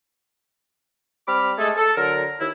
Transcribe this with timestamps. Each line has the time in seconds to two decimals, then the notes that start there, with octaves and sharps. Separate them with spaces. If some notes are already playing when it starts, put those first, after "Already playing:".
1.27 G3 C4 B5 D6 F6
1.58 G#3 A3 G#4 A4
1.77 A4
1.96 D3 F#3 A#4
2.40 D#2 E4